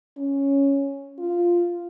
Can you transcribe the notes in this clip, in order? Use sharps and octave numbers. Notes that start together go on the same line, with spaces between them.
C#4
F4